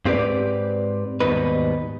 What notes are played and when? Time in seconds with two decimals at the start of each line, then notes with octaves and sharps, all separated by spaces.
0.05 G#2 C4 G4 B4 D5
1.20 D#2 G#2 B2 G3 D#4 B4